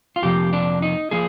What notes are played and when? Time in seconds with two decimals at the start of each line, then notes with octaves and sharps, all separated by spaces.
0.16 F4
0.22 F2 C3 F3 A#3 G4
0.53 D4
0.82 D#4
1.11 F3 A#3 G#4